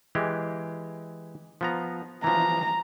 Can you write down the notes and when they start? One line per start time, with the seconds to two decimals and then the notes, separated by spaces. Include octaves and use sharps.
0.15 E3 G#3 G4
1.61 F3 B3 A#5
2.24 E3 F3 A#5